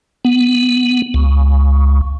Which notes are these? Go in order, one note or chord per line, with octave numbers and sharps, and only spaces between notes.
B3
C#2